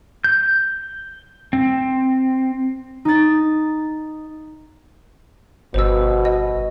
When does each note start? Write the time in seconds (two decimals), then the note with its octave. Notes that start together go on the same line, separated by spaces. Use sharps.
0.24 G6
1.53 C4
3.05 D#4 A6
5.74 G1 B2 C5 E6
6.25 D#5